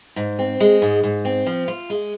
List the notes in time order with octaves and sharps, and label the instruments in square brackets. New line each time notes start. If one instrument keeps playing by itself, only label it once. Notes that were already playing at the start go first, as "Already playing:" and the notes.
[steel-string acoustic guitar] G#2
C4
G#3
G#2
G#2
C4
F3
F4
G#3